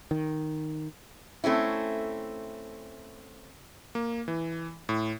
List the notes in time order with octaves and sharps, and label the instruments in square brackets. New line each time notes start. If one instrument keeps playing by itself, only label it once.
[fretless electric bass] D#3
[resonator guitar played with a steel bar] A3 C4 C#4 E4
[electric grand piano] A#3
E3
A2